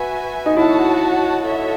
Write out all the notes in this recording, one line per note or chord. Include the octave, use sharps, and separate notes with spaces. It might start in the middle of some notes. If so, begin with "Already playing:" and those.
Already playing: F#4 B4 E5 G#5
D#4
E4 F#4 C#5 F#5 A5
F#4 A4 C#5 E5